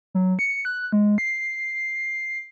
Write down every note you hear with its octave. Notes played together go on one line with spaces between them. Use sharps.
F#3
C#7
F#6
G#3
C7